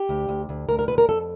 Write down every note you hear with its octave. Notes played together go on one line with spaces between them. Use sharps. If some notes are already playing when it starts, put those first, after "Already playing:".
Already playing: G4
D2
D2
D2
D2 A#4
A#4
D2 B4
A#4
F2 A4